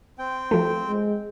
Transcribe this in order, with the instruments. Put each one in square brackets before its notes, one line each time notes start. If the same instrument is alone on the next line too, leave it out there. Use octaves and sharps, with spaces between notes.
[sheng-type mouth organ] C4 G5
[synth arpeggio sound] F3 A3
[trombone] G#3